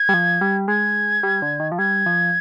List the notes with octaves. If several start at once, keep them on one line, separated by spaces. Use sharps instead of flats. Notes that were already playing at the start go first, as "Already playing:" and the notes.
Already playing: G#6
G3
F3
G3
G#3 G#6
G3
D3
D#3
F3
G3 G#6
F3